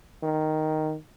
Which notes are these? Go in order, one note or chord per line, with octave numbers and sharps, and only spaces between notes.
D#3